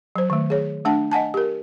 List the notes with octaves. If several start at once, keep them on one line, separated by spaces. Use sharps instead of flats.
F#3 C5
D#3 A3
G#4 C#5
A3 D4 F#5 A5
D#5 F#5 G#5 A5
G4 A#4